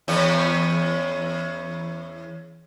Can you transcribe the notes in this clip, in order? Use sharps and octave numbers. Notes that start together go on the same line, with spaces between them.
E2 C#4